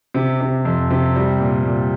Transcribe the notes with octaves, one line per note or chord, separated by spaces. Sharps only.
C3
C3
F2
C3
G3
A#2
A#2